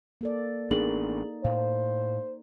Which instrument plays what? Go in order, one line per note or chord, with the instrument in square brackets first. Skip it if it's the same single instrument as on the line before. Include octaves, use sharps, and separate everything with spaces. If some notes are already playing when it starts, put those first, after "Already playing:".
[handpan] A#3 A4 D5
[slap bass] A1 B3 D4 [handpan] D#4 [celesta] G#4 A#4 F#7
[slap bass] A2 [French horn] C5 [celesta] F5